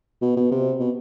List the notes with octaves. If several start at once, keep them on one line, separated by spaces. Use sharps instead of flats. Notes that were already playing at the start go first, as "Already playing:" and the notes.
B2
B2
C3
B2